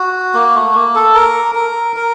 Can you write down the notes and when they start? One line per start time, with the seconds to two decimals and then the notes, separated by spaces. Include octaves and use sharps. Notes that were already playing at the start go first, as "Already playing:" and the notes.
Already playing: F#4
0.34 A#3
0.55 A3
0.74 A#3
0.95 A4
1.15 A#4
1.55 A#4
1.96 A#4